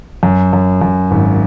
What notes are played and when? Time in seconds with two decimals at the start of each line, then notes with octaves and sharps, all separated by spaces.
0.23 F#2
0.53 F#2
0.82 F#2
1.11 G#1